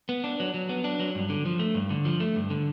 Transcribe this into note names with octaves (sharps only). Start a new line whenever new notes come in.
B3
D4
F#3
F#3
B3
D4
F#3
G2
D3
F3
A3
G2
D3
F3
A3
G2
D3